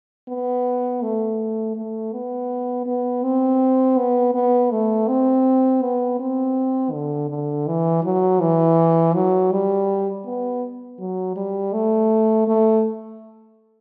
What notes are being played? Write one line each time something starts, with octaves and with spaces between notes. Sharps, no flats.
B3
A3
A3
B3
B3
C4
B3
B3
A3
C4
B3
C4
D3
D3
E3
F#3
E3
F#3
G3
B3
F#3
G3
A3
A3